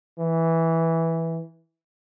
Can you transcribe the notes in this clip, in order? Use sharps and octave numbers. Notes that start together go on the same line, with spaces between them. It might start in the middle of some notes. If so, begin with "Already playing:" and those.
E3